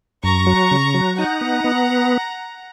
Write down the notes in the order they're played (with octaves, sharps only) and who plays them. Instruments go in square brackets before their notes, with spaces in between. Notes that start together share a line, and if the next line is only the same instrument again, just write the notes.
[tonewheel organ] F#2 [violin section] A#5 C#6
[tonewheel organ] F#3
C#3
F#3
[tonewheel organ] D#4 [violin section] F#5 A#5
[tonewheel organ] B3
B3